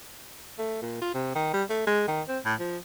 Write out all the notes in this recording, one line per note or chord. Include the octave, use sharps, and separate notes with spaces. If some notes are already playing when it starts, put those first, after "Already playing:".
A3
A#2
F4
C3
D#3
G3
A3
G#3
D#3
C4
A2
F3